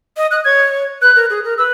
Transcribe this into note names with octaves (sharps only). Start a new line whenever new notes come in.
D#5
D#5 F#6
C#5 G#6
B4 F#6
A#4
G#4
A#4
B4 E6